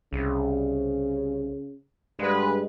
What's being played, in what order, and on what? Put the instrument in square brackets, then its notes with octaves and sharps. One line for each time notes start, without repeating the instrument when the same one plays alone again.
[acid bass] C2 [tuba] C#3
[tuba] G2 [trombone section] D3 B4 [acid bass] G#3